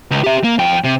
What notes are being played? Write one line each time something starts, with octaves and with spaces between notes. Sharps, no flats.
C#2
G4 E5
A#3
F2 G5
C3